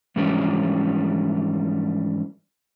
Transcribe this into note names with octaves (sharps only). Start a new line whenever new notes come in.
G#2 E3 F3 G3 C#4 D4